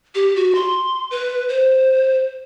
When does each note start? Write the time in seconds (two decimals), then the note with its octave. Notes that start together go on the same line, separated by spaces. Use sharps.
0.15 G4
0.36 F#4
0.55 C6
1.11 B4
1.49 C5